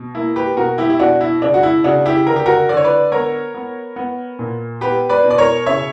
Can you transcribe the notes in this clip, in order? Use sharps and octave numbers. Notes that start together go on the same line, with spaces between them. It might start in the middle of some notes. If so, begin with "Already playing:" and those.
Already playing: B2
A#3 E4
G4 B4
B2 F#4 A#4
E4 G4
E4
B2 D4 F#4
E4
C#3 D4
F#4
E4
C#3 D4 F#4
E4 G4
D3 A#4
G4
F#4 A#4
D3 D5
C#5
B4 D5
B3 A#4 C#5
B3
B3
A#2
B3 G4 B4
B4 D5
B2
D5
A#4 C#5
C#3 C#5 E5